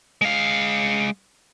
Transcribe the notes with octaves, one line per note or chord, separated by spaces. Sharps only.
G#3 F5